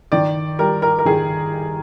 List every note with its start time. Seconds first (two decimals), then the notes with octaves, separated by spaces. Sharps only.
0.12 D#3 D5
0.59 G3 A#4
0.82 A#4
0.99 A#4
1.05 D#3 G#4